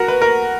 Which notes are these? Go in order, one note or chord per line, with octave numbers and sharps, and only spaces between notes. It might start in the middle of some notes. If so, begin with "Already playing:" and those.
Already playing: F#4 A#4
B4
A#4